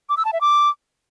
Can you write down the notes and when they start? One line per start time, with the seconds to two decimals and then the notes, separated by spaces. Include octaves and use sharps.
0.09 D6
0.17 E6
0.25 A5
0.33 E5
0.41 D6